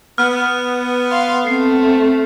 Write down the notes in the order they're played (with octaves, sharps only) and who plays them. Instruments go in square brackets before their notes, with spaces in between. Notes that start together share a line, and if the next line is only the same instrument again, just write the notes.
[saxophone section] B3 [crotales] F6
[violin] F5 C6
[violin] A3 [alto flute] C4 [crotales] C7